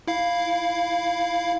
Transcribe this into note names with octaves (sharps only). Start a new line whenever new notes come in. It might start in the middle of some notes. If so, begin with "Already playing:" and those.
E4 F5